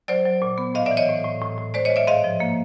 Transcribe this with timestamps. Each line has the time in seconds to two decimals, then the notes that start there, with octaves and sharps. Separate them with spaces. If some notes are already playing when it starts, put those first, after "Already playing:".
0.08 F#3 C5 D5
0.25 F#3
0.42 A#2
0.58 B3
0.74 A2 D#5 F5
0.86 D5 E5
0.91 E3
0.97 C#5 D#5
1.09 A2
1.24 A2
1.41 A2
1.58 A2
1.74 G#3 C5 D5
1.85 C#5 D#5
1.90 G#3
1.96 D5 E5
2.07 G#2 D#5 F5
2.24 F3
2.40 A#3